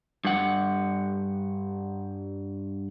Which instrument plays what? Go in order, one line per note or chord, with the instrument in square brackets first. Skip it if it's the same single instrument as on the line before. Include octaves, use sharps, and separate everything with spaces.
[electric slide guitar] G2 F#5